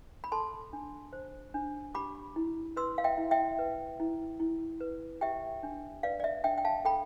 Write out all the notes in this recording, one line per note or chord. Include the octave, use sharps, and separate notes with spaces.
B5
A4 A5 C6
D4
C5
D4
G4 B5 D6
E4
B4 C6 E6
F5
E5 G5
E4
E5 G5
B4
E4
E4
B4
G4 E5 G5
D4
B4 D5 F5
D5
E5
D4 E5 G5
G5
F5 A5
A4 G5 B5